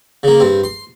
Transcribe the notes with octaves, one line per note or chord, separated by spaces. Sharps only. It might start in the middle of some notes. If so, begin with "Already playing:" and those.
C#3 A#3
G2 C4
C6